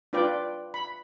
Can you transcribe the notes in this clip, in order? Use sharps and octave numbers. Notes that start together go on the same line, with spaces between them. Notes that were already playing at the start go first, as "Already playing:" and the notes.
D4 F4 B4 D5 G5
B5